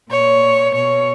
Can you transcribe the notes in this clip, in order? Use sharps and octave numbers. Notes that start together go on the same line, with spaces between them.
A#2 C#5
B2 C#5